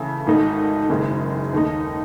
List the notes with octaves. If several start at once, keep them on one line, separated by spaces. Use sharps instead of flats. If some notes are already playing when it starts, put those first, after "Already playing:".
Already playing: C#3 E3 A3 E4
G#1 G#2 D#3 A3 D#4
F#1 F#2 D#3 G#3
D#2 D#3 A3 D#4